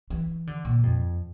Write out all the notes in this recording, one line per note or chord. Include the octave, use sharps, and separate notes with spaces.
E3
D3
A#2
F2